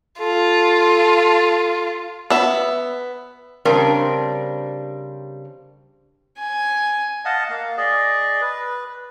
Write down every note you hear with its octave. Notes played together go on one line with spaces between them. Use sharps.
F4 A4
B3 E5
C#3 G3 C4 D4 A#4
G#5
D#5 F5 F#5 A5
A#3 F5
G#4 D5 D#5
B4